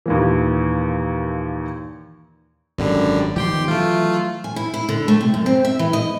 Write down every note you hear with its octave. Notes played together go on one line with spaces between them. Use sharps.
D#2 A#2 E3
G#1 F#2 D3 G3
D#3 F3 B3 G4 G5 C6
E3 F#3 A3 F4
G#5
E4
E4
D3
A3
C3
F#2
C4
E5
E3
D#5